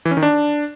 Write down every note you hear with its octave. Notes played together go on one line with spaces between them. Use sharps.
E3
C#4
D#3
D4